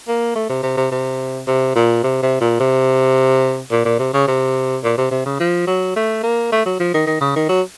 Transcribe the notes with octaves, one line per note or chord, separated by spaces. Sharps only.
A#3
A3
C3
C3
C3
C3
C3
A#2
C3
C3
A#2
C3
A#2
A#2
C3
C#3
C3
A#2
C3
C3
C#3
F3
F#3
A3
A#3
A3
F#3
F3
D#3
D#3
C#3
D#3
F#3